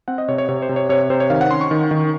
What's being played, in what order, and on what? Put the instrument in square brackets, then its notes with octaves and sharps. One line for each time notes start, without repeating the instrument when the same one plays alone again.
[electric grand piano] C4 F#5
D#5
C3 C#5
C#5
C3 C#5
C5
C3
C#5
C3 C#5
C3 C5
C#5
D#3 F5
F#5
C#4 C6
C#6
D#3
D#3